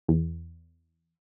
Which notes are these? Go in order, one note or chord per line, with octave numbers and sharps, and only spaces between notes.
E2